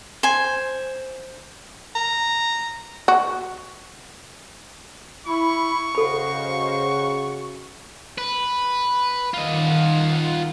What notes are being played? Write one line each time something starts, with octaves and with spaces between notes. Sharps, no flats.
C5 G#5
A#5
F#4
E4 B5 C#6
C#3 F#4 A4 C5 D#5 F5 B5
B4
D#3 F4 D#5 F#5